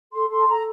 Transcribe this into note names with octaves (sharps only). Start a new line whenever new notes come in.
A4 C6
A4 C6
A5
A4 A#5